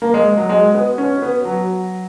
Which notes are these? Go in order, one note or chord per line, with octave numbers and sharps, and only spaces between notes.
A#3
G#3
F#3
G#3
B3
C#4
B3
F#3